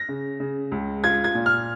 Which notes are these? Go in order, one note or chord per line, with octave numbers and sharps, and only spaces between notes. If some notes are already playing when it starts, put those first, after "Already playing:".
Already playing: A#6
C#3
C#3
C#2
F4 G#6
G#6
A#2
F6